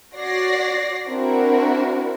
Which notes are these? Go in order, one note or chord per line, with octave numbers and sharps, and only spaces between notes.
F#4 C#5 D5 A#6 C7
C4 D4 E4 F#4 A#4